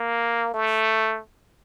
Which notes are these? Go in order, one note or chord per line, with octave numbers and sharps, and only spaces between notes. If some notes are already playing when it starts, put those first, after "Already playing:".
Already playing: A#3
A3